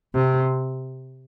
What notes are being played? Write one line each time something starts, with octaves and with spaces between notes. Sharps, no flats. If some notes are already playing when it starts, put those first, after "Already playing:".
C3